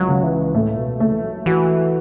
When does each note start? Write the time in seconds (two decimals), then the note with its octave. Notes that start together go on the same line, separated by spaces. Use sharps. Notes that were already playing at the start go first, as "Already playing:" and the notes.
Already playing: C#2 F#3
0.08 C#3
0.23 E3
0.55 A2 A3
0.77 B2
1.00 C#3 A3
1.12 E3
1.23 F#3
1.46 E3 F#4